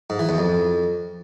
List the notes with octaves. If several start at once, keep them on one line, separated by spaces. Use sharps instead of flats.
G#2
E3
E2
F2